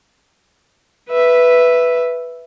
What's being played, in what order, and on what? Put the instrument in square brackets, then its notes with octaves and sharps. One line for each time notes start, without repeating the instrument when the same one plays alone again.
[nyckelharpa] B4 E5